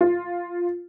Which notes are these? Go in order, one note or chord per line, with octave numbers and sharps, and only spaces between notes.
F4